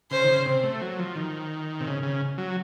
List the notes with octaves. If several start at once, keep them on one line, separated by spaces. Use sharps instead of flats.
C#3 C5
D#3
C#3
C3
A3
F#3
F3
D#3
C3
C#3
C#3
F#3